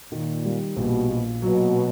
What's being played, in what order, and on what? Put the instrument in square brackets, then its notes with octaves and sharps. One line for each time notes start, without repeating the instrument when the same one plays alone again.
[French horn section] A#2 [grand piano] D#3
[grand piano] G3
[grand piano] A#1 [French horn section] B2
[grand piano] A#2
[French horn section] B2 [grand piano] F#3